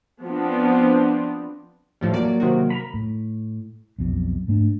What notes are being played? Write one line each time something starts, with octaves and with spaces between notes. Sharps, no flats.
F3 B3 C4 D4
A2 F3 G3
F#3 A#3 D5
C3 D#3 F#4
A#4 A#5 B5
A2
B1 F2
G#2 A3 D4